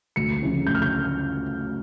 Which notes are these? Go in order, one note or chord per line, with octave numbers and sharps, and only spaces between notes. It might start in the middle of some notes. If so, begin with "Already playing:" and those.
D2 C#7
C#3 F3 C#4 E4
D2 G6
F6
G6